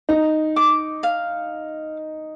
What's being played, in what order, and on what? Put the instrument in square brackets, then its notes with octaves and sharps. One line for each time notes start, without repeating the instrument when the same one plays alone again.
[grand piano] D#4 [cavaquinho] A#5
[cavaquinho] D6
F5